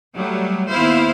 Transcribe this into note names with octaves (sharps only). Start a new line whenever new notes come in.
F#3 G3 A3
D#2 B3 E4 C5 F5